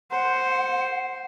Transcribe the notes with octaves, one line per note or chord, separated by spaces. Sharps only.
C5 F#5